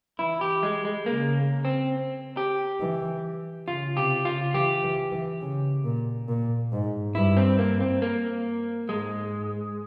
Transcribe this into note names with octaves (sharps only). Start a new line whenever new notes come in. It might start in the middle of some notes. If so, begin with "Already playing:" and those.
E3 E4
G4
G#3
G#3
C#3 A#3
C4
G4
E3
C#3 F4
C3 G4
C#3 F4
E3 G4
E3
E3
C#3
A#2
A#2
G#2
G2 E4
C4
A#3
C4
A#3
G#2 G#3